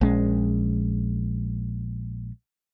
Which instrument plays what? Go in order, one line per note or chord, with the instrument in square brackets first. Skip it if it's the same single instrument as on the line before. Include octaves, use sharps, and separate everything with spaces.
[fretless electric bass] A#1 G#3 C#4